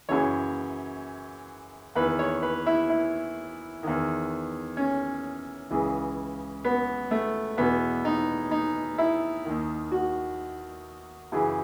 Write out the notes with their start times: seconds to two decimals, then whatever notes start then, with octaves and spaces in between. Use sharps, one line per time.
0.09 F#2 C#3 E3 C#5
1.95 E2 B4
1.99 D#3
2.19 C#5
2.42 B4
2.66 E4
2.89 E4
3.83 E2 D#3
4.77 C#4
5.70 C#2 C#3 E3
6.64 B3
7.11 A3
7.58 E2 B2 B3
8.05 D#4
8.51 D#4
8.98 E4
9.45 D#2 D#3
9.92 F#4
11.32 F#2 C#3 E3